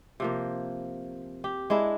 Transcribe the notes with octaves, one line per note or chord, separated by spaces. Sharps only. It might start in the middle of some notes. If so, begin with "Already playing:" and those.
C3 F3 A#3
G4
G#3 D4 E4